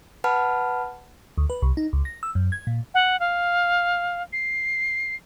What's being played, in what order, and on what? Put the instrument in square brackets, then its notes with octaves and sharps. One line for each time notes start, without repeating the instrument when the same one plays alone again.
[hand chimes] B4 F#5 A5 B5 F6
[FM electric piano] D2
B4
C2
D#4
C#2
A#6
E6
F#2
G#6
A#2
[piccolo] F#5
F5
C7